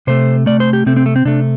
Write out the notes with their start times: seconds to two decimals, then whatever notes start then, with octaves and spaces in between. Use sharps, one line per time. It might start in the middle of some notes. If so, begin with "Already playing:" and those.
0.07 C3 A3 C5
0.46 C3 A3 D5
0.60 C5
0.73 G4
0.86 C3 A3 C4
0.97 C4
1.06 A3
1.16 C4
1.25 C3 A3 D4